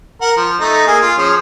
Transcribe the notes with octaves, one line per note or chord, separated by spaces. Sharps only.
A#4 F#5
F3
A3 D#4 A#5
A#3 G#4 G#5
F4
F3 C#4 G#4